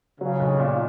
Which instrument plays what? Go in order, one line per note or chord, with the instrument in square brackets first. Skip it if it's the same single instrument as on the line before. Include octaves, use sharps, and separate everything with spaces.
[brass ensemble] C#3 [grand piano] F#3
[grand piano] B1
A#2